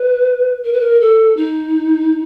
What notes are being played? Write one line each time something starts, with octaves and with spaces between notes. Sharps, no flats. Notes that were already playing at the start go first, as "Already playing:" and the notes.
Already playing: B4
A#4
B4
A#4
A4
D#4